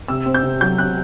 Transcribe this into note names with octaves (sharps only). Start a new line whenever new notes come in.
C3 E6
C4
G6
C3
F#3 G6
C3 F#6